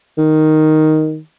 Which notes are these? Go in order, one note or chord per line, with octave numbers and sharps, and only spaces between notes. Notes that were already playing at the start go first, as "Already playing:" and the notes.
D#3